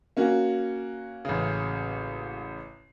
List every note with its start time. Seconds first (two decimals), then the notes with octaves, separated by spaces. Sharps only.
0.17 A#3 C#4 F#4
1.25 A1 C#3